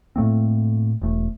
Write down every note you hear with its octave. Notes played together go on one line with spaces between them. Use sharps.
A2 A3 A#3 C4
E1 A3